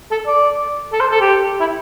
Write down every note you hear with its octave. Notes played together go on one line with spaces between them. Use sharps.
A4
D5
A4
C5
A4
G4
E4